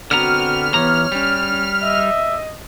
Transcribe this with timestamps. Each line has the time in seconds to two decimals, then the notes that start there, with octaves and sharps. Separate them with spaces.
0.11 D3 B3 C4 F#4 A#5 F6
0.74 E3 B3 G4 C#5 A#5
1.12 G3 C#4
1.83 D#5 E5